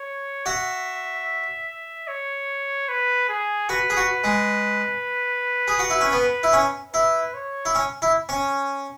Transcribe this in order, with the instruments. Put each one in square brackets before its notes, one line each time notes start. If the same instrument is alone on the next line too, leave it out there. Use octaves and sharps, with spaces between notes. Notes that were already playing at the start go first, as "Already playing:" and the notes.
Already playing: [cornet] C#5
[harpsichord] F#4 [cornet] E5
[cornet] C#5
B4
G#4
[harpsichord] F#4 [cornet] B4
[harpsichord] G#4
F#4
G#3
G#4
F#4
E4
C#4
B3
E4
C#4
[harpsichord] E4 [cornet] B4
[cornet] C#5
[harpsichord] E4
C#4
E4
C#4